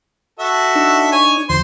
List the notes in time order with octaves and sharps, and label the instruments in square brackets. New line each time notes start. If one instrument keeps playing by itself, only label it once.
[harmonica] F#4 A4 E5
[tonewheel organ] D4 D#4
[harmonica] C#5 G#5
[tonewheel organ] D#2 D3 F3 [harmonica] C5 C6